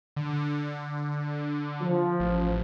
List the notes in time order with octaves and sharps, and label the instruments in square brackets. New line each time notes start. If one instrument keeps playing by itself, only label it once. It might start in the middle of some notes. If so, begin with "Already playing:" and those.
[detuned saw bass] D3
[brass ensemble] F3
[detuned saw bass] A1